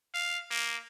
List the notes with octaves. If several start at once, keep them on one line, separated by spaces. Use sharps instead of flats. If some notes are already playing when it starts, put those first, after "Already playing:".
F5
A#3